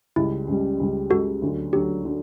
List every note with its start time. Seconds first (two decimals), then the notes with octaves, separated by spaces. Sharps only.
0.16 C#2 C#3 G3 E4
0.48 C#2 C#3 G3
0.80 C#2 C#3 G3
1.10 C#2 C#3 G3 F#4 A4
1.42 D2 D3 F#3
1.73 D2 D3 F#3 G4
2.04 D3 F#3